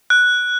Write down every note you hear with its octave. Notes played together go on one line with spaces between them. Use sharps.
F#6